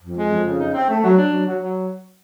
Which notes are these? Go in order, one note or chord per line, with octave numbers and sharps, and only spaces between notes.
F2
G#3
F2
C#3
D#4
C4
A3
F#3
D4
F#3
F#3
F#3